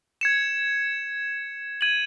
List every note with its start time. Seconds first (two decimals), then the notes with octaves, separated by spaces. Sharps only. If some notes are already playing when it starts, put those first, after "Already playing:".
0.21 G#6 C#7 E7
1.81 G#6 D#7 F#7